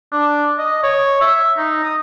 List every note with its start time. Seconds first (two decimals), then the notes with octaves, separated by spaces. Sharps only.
0.12 D4
0.59 D#5
0.83 C#5
1.21 E5
1.57 D#4
1.84 D#6